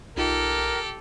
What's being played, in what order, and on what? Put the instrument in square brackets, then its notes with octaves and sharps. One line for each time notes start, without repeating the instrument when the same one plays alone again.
[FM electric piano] B1 D#4 F4 [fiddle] G4 A4 [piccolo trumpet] A#4